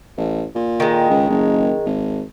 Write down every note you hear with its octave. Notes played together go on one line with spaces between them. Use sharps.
A1
A#2
D#3 G#3
C#2
F#1
G#1